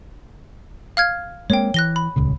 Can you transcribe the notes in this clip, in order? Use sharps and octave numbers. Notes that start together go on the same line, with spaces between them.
F5 F6 G#6
G#3 A#3 C4 C#5 G5
E3 F#6 A#6 G7
B5
D#1 C#2 C#3